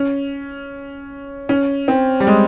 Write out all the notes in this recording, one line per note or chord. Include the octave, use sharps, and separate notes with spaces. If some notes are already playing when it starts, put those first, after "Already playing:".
Already playing: C#4
C#4
C4
G3
G#3